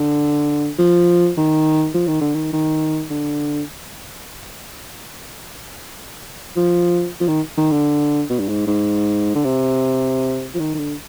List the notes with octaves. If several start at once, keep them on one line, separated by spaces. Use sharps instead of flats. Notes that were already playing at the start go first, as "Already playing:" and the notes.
Already playing: D3
F3
D#3
F3
D#3
D3
D#3
D#3
D3
F3
F3
D#3
D#3
D3
B2
G2
G#2
G#2
D3
C3
F3
D#3
D#3
D3